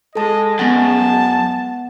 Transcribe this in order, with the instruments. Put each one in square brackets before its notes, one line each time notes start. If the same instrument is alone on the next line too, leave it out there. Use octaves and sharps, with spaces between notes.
[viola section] G#3 [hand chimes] A4 A5 [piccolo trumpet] D#5
[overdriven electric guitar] F#2 [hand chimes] B3 F#5 [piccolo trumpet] A5